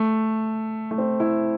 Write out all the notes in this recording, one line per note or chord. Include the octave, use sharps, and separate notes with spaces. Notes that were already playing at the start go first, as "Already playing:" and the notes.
Already playing: A3
A3
C4
E4